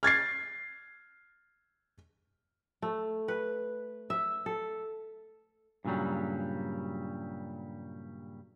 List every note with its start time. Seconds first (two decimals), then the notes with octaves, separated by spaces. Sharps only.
0.03 F6 G#6 A6 C7
2.82 A3
3.28 B4
4.10 E5
4.46 A4
5.85 G2 A#2 C#3 F#3 G3